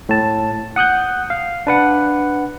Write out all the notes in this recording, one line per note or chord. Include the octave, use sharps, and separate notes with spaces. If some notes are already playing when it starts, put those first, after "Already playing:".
A2 A5
F#5 D#6 F#6 G6
F5
D4 B4 F#5